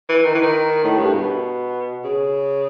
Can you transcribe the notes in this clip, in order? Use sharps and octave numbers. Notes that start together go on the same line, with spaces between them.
E3
D#3
E3
D#3
A2
G2
B2
C#3